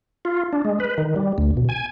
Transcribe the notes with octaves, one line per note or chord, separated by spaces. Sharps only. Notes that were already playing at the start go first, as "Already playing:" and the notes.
F4
D4
G#3
B4
D#3
G3
D2
B2
G#5